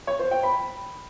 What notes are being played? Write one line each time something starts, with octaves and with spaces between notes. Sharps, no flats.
C#5
C5
G5
B5